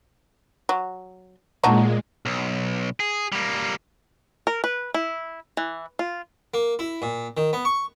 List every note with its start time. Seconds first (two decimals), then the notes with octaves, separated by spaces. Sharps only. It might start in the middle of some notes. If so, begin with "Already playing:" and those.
0.69 F#3
1.64 A#2 F#3 G#3 D4 D#4
2.26 B1
3.00 G#4
3.32 G3 A#3
4.47 A#4
4.64 B4
4.94 E4
5.57 E3
5.99 F4
6.54 A#3
6.79 E4
7.02 A#2
7.37 D#3
7.53 B3
7.65 C#6